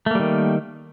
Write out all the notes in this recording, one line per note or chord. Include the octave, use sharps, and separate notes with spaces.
D#3 G3 A3 A#3